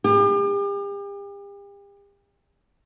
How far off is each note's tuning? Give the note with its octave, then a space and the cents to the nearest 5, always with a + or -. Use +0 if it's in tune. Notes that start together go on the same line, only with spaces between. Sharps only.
G4 +40